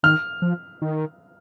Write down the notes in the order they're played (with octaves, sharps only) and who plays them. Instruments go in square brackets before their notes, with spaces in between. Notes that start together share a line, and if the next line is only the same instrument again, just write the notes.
[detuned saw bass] D#3 [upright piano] F6
[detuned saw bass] F3
D#3